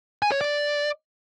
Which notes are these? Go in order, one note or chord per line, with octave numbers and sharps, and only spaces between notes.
G#5
C#5
D5